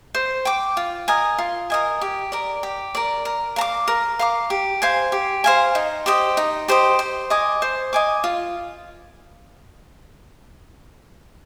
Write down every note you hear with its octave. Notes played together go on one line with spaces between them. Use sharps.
C5
G5 D6
F4
A#4 D#5 G#5
F4
A#4 D#5 G#5
G4
A#4 D5
G4
A#4 D5
A#4
F5 A#5 D6
A#4
F5 A#5 D6
G4
C5 F5 G#5
G4
C5 F5 G#5
D#4
G4 C5 D#5
D#4
G4 C5 D#5
C5
D#5 G#5 D6
C5
D#5 G#5 D6
F4